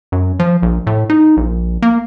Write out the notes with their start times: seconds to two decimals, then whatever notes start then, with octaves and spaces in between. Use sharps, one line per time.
0.12 F#2
0.40 F3
0.63 A#1
0.87 A2
1.10 D#4
1.37 A#1
1.82 A#3